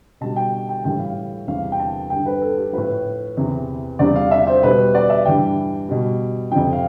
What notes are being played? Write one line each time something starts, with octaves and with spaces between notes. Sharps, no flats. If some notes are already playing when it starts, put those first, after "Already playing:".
B2 G3 A5
G5
G5
A2 E3 G3 G5
F5
E2 C3 E3 G3 F5
G5
A5
G2 D3 G3 G5
B4
A4
G4
A2 F3 B4
E2 C3 E3
E2 C3 E3 G3 D5
F5
E5
C5
B2 G3 B4
D5
E5
G2 E3 G3 G5
B2 G3
F2 C3 F3 G5
F5